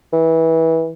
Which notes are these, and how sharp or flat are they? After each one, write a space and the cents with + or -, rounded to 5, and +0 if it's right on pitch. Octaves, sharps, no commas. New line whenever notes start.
E3 -20